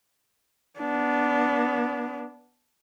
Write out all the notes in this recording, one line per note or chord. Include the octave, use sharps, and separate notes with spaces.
B3 D4